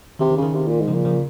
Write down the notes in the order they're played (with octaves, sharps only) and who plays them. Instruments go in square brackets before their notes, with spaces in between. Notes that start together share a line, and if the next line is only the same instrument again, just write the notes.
[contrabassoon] C3 [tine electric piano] D#3
[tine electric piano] D#3
[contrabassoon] C#3
[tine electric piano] D#3
[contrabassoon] C3
A#2
G#2
[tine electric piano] C#3 F3
[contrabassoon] A#2
[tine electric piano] C#3 F3